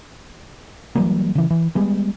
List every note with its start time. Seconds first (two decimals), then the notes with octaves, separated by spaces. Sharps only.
0.95 E3 F#3 G3 A#3
1.35 C#3 E3
1.50 E3
1.75 G3 G#3 B3